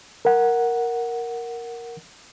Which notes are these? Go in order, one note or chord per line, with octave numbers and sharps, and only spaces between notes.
A#4 F#5